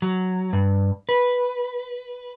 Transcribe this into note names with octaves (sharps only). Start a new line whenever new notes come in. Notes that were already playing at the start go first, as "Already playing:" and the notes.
F#3
G2
B4